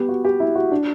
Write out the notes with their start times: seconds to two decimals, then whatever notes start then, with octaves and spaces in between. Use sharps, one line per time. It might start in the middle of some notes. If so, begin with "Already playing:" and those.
Already playing: B3 G4
0.09 F#4
0.25 G4
0.40 E4
0.55 F#4
0.71 D4